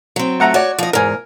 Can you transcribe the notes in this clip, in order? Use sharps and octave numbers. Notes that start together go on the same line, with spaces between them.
F#3 C4
A3 F#5 A#5
F#4 C#5 D5
F3 D#5
E2 G#2 A#4 G#5